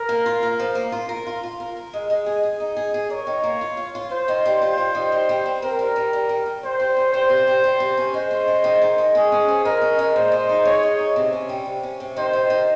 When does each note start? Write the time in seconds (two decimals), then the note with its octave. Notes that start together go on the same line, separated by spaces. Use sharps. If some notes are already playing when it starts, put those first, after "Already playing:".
Already playing: A#4
0.09 A#3
0.26 F4
0.43 A#3
0.59 F3
0.75 A#3
0.92 F4
1.09 A#4
1.26 F4
1.43 F4
1.60 A#4
1.77 A#4
1.93 G#3
2.10 G#3
2.26 G#4
2.43 G#4
2.60 D#4
2.76 G#4
2.94 G#4
3.10 A#4 C#5
3.27 D#3
3.44 A#3
3.61 F4
3.77 F4
3.95 F4
4.11 F4 C5
4.28 D#3
4.45 G3
4.62 F4 C5
4.78 G3
4.95 D#3
5.12 G3
5.29 G3
5.46 C4
5.62 C4 A#4
5.79 G3
5.96 G3
6.13 G3
6.29 G3
6.46 G3
6.63 G3 C5
6.80 G3
6.97 C#4
7.13 G3 C5
7.29 C3
7.47 G3
7.64 G3
7.80 C3
7.97 C#4
8.13 G#3 C5
8.31 C#4
8.48 G#3
8.64 D#3
8.81 D#3
8.98 G#3
9.15 C#4 G#4
9.32 C#4
9.48 F3
9.65 G#3 A#4
9.81 C#4
9.99 G#3
10.15 A#2 C5
10.32 G#3
10.49 D#4
10.65 G#4 C#5
10.83 G#3
10.99 D#4
11.16 C3
11.33 C#4
11.49 G3
11.66 C3
11.83 C#4
12.00 C3
12.16 D#3 C5
12.33 D#3
12.50 D#3